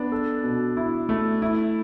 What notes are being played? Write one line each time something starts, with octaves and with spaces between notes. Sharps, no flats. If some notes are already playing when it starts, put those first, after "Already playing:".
Already playing: B3 D4
A4
B2
E4
A3
E4